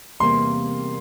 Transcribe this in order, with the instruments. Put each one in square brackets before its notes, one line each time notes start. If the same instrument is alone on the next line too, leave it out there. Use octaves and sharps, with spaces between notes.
[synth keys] E2 C3 G3 A#3 [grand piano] C6